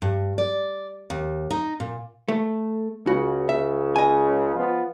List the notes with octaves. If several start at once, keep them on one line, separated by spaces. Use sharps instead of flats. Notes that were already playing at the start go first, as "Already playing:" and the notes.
G2
D5
D#2
D#4
A#2
A3
C#2 C#3 F#4
E5
D#5 G#5
F3 B3 F4